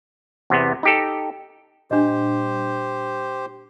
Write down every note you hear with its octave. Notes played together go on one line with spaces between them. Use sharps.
E2 C3 B3
D#4 G4 A4
A#2 G3 D4 G4 C5 D#5